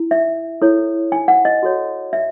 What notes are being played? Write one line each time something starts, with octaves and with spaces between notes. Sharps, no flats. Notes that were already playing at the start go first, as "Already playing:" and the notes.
Already playing: E4
E5
E4 A4 C#5
G#5
F#5
D#5
F#4 A4 C#5
E5